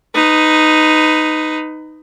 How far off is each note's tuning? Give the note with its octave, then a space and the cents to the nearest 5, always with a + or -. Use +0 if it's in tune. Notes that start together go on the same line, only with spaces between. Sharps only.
D#4 +0 B4 +20